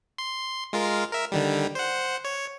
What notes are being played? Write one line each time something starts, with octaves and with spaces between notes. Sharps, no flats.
C6
G#3 F4 A#4
A#4 E5
D3 D#3 G3
C5 F#5
C#5